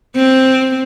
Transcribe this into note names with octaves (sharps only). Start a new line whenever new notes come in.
C4